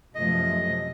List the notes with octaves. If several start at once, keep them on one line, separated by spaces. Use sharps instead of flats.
F#2 C3 F3 A3 D#5